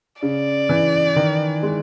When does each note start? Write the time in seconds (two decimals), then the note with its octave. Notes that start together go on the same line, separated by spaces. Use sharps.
0.22 C#3 D5
0.69 E3
1.16 D#3
1.63 G#3